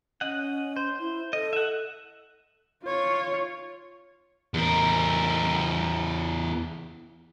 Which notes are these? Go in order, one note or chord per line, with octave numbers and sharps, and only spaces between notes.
C#4 D#5 F#5
C5
E4
A4 D#5
E5 F#5
F4 C#5
E2 A#4